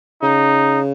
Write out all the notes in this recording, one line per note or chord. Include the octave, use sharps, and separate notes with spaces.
C#3 D#4